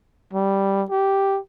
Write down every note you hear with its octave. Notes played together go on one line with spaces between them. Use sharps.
G3
G4